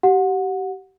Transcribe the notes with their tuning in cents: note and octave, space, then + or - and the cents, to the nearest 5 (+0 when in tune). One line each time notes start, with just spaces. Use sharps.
G4 -30 F#5 -20